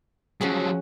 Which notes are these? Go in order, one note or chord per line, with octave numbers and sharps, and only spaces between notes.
F3 F#3 C#4 F#4 G#4